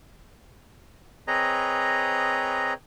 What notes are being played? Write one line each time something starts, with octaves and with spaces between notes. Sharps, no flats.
C4 G#4 B4 C#5 D#5 A#5